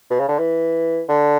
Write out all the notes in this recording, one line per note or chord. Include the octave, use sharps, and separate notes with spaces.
B2
C#3
D3
E3
D3